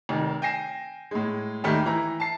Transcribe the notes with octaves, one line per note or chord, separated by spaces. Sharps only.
F1 D#3
G5 G#5 A#6 C7 E7
A2 G#3
D#2 D#3 G3 A3 A#3
E3 E4 A#5
A5 C7